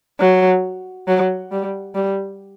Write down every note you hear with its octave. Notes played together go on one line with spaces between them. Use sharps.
F#3
F#3
G3
G3